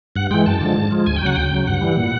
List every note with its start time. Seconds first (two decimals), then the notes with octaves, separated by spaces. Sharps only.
0.16 G2 F#5
0.31 E3 G#3 G5
0.46 F#2 A5
0.61 D3 F3 G#3
0.77 G#2
0.91 F3 G#3
1.06 D2 G#5
1.16 G5
1.22 C#3 F#3 F#5
1.36 D2 G5
1.51 C#3 F#3
1.67 G2 F#5
1.81 E3 G3
1.96 A#2